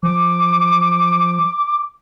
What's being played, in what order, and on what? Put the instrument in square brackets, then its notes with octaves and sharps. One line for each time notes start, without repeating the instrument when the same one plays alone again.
[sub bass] F3 [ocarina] D6